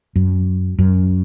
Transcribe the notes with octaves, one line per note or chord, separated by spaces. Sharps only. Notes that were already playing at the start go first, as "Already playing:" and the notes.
F#2
F#2